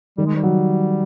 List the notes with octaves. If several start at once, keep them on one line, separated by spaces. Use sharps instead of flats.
D#3 G3
G#3
G3
F#3